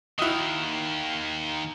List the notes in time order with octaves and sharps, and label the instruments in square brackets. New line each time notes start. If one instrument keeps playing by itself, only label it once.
[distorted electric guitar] D#2 D#3 [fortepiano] E4 F#4 D#5